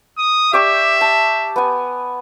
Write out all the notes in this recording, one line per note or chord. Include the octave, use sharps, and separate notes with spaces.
D#6
G4 D5 E5 C#6
A5
B3 G#5